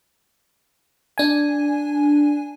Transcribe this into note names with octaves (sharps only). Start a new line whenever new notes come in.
D4 G#5